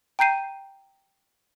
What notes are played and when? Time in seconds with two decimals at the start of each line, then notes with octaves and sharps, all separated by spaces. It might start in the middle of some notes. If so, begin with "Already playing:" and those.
0.19 G5 A#5 G6 C7 D#7